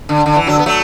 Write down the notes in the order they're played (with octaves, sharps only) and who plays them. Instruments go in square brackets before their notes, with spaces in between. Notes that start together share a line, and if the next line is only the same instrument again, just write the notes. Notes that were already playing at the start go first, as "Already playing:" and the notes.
[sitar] D3
D3
E3
D3 F#3
B3
F#3 A3